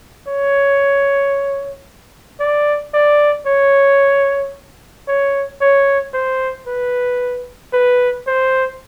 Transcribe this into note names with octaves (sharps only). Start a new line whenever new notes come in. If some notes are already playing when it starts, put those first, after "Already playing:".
C#5
D5
D5
C#5
C#5
C#5
C5
B4
B4
C5